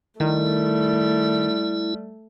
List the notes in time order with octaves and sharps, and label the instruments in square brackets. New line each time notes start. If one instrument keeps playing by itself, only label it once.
[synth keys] D#3 [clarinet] G3 [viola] A3 [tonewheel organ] E4